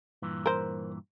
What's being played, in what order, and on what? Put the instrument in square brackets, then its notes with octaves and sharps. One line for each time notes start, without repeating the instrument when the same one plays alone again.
[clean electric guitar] G2 A#2 E3
[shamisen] A#4 C5